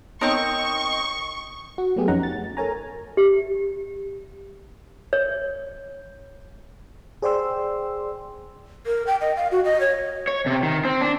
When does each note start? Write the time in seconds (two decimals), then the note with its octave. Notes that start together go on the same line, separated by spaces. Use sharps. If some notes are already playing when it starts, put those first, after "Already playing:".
0.21 B3 C4 D#4 A#4 C#5 D#5 C#6
1.78 F#4
1.96 F#3 A3 B3 G4 G#4
2.08 F2 C#4 D#4 F#5 A#5
2.23 A6
2.57 A4 A#4 C#5 G#5 A#5
3.17 G4
5.13 C#5
7.22 G#4 C5 D5 G5 C6 E6
8.86 A#4
9.07 G5
9.21 D#5
9.37 F5
9.51 F#4
9.65 D#5
9.80 C#5
10.28 C#5
10.46 C3
10.63 D#3
10.85 C4
11.01 D4